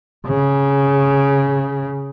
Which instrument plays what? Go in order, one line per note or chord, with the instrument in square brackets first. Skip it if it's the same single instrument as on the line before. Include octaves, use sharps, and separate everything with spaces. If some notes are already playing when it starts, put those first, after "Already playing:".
[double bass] C#3